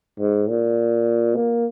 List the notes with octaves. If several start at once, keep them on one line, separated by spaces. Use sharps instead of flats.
G#2
A#2
A#3